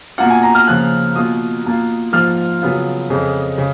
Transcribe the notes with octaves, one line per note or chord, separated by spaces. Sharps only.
B2 A#3 F4 F#5
G#5
A#5
F6
C#3 F3 A#3 F#6
B2 A#3 F4 D#6
B2 A#3 F4
G#2 F3 A#3 F4 F6
C#3 F#3 B3 F4
F2 C#3 G#3
C#3